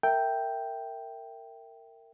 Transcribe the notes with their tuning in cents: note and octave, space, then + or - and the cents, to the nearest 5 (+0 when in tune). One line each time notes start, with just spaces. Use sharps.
A#4 -25 E5 +0 G5 +0